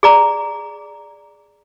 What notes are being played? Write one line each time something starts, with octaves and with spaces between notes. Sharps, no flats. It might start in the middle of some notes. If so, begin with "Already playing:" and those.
G#4 D5 A#5